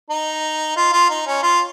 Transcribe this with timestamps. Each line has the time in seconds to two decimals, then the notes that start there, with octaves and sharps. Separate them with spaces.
0.10 D#4
0.77 F4
0.93 F4
1.10 D#4
1.27 C#4
1.43 F4